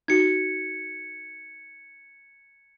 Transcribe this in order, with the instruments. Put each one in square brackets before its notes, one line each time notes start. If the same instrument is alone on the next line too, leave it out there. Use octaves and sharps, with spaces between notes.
[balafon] D#4 F#4 [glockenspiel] G#6 C#7